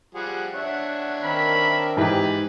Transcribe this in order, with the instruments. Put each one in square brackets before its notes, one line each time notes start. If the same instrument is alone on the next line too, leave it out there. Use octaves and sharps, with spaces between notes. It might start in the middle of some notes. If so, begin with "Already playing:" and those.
[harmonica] F3 G3 G#4 [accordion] F#5
[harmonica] D4 C#5 E5
[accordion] D#3 C4 A#4 [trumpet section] B5
[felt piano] G#2 E3 G4 [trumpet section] G#4 B4